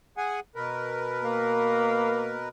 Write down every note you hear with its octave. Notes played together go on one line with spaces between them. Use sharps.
G#4 F#5 G#5
B2 A#4 B4
A#3